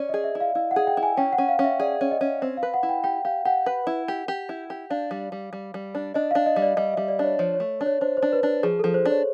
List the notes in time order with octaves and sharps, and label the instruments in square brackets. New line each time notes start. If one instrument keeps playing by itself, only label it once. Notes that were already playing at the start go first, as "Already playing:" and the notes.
Already playing: [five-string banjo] C#4 [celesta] D5
[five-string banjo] G#4 [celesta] D#5
[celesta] E5
[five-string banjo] E4
[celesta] F5
[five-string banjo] E4 [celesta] F5
[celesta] F#5
[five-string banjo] G#4
[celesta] G5
[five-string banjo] E4
[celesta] G#5
[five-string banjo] C#4 [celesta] G5
[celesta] F#5
[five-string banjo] C#4
[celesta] F5
[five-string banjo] C#4
[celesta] E5
[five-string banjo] G#4 [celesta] D5
[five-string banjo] C#4
[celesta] D#5
[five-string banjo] C#4
C4
[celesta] F5
[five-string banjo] B4
[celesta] F#5
[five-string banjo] E4
[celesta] G5
[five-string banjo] G4 [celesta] G5
[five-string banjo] G4 [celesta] F5
[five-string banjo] G4 [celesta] F#5
[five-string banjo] B4
E4
G4
G4
E4
G4
[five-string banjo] D4 [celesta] F5
[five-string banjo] G3
G3
G3
G3
D4
[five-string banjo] D4 [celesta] D#5
[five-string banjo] D4 [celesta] F5
[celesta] D#5
[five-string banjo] G3
[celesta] D5
[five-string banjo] G3 [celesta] D#5
[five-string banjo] G3 [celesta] E5
[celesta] D5
[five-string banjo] D4 [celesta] C#5
[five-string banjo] F3 [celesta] C#5
[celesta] C#5
[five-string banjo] A3
D4
[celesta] C#5
[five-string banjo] D4 [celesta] C5
[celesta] C5
[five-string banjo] D4
[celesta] B4
[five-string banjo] D4
[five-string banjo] F3 [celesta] G#4
[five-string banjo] F3 [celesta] A4
[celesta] C5
[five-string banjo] D4 [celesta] C#5